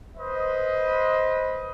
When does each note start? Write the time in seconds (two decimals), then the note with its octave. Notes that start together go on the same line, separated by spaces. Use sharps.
0.17 B4 C5 D#5